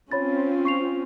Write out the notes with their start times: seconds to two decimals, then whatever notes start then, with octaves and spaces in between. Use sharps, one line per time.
0.11 C4 C#4 F4 C#5 B5 A6
0.65 C#6 C7 F7